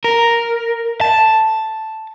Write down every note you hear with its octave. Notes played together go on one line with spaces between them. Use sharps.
A#4
A5